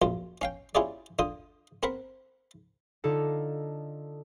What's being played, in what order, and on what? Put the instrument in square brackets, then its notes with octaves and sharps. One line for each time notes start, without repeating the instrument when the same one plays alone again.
[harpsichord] A#1 F#2 F4
C#4 F5 G5
C#4 E4 F4 G4 G#4 D5
D3 F4 D#6
C4 A#4 F#5 B5
[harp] D3 D#4 F4 A4